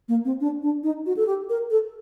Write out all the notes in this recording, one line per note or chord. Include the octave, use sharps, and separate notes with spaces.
A#3
C4
D4
D4
D#4
F#4
A4
G4
A#4
A4